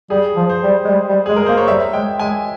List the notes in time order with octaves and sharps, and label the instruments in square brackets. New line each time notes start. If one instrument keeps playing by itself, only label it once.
[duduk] G3 [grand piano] G#4
[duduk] F3
[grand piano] C5
[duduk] G3
G#3
G3
G3
[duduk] G#3 [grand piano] G#4
[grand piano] A#4
[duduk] A#3 [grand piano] C5
[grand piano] C#5
[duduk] G3 [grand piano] E5
[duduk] G#3 [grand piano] G5
[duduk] G#3 [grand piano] G#5